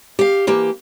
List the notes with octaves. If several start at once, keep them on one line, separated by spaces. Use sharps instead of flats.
G4 F5
E3 A#3 G4